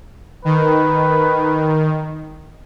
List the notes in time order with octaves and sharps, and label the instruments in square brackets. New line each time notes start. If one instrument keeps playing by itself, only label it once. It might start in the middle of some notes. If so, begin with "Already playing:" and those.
[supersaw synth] D#3 [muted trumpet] B4